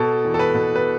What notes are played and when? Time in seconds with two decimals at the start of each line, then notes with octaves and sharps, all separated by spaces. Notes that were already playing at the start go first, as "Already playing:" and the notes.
Already playing: B2 A4
0.24 E2
0.34 A4
0.39 B4
0.55 B2
0.76 B4